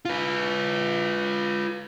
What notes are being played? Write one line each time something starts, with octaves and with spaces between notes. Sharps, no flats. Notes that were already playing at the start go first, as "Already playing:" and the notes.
F4 B4